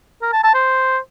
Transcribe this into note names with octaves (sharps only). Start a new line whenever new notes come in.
A#4
A5
A5
C5